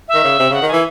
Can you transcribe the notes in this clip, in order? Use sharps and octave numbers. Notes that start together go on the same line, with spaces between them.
E5
D#3
C#3
C3
C#3 F#5
D#3
E3 G#5